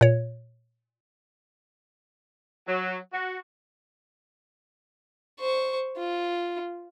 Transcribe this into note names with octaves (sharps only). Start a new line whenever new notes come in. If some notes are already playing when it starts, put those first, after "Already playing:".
A#2 C#5
F#3
F#4
C5 C#6
F4